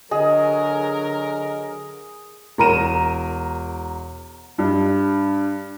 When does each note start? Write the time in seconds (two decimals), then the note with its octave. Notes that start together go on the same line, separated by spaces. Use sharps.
0.11 D3 F#3 G#4 A#4 D#5
2.58 E1 A#4 A#5 D#7 E7
4.58 G2